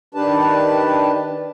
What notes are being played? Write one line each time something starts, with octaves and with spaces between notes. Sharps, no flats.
D#3 D4 G4 B4 A5